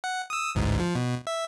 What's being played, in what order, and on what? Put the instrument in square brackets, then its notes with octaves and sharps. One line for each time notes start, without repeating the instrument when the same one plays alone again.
[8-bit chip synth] F#5
D#6 E6
A1 D2 G#2
F3
B2
E5